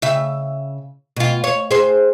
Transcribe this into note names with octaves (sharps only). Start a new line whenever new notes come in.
C#3 E5
B2 F4
C#5
G#4 C5